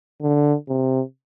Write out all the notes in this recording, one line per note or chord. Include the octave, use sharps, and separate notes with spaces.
D3
C3